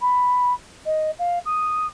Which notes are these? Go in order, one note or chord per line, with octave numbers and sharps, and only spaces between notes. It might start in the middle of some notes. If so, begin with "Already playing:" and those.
B5
D#5
F5
D#6